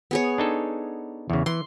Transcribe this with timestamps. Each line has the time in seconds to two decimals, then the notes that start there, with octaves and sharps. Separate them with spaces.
0.11 B3 G#4 C#5
0.38 D4 D#4 A4
1.30 E2 C#3
1.46 E3 C6